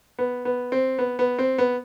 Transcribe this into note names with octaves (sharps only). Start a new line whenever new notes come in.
B3
B3
C4
B3
B3
C4
B3